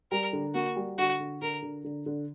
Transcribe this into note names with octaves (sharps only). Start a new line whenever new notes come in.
G3 A#4
D3
A#3 F#4
G3
D3 F#4
D3
D3 A#4
D3
D3
D3